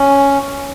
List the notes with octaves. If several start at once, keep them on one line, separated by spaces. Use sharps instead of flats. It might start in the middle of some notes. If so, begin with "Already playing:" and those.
Already playing: C#4